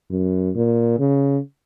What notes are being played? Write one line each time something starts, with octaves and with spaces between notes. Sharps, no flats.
F#2
A#2
C#3